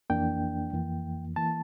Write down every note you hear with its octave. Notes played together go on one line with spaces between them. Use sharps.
F2 E3 A#3 D4 G5
F2 E3 A#3
E3 A#3 A5